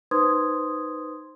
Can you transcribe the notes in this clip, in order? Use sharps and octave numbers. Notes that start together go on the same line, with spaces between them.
D#4 B4 C5 C6 D#6 G#6